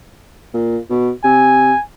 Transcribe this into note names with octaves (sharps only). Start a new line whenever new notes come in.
A#2
B2
C3 G#5